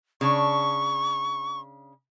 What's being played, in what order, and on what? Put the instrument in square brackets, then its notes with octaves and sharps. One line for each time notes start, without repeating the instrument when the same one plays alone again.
[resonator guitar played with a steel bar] C#3 D4 [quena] C#6